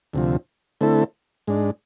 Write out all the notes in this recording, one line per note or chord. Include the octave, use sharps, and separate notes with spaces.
D2 C3 F3
D3 A3 C4 E4 A4
G#2 G#3 D4